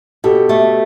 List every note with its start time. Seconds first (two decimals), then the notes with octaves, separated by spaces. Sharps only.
0.24 B2 G4 A4
0.49 A3